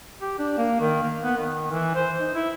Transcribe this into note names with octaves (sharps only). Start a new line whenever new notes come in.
G4
D4
A#3
D#3
A#3
B3
D#3
E3
C5
D#4
E4